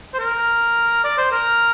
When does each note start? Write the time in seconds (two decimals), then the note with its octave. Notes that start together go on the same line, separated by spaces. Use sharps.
0.14 C5
0.19 A#4
1.04 D5
1.18 C5
1.32 A#4